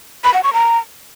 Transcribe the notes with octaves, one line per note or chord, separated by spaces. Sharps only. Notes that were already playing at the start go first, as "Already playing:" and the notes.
B5
F#5
C#6
A#5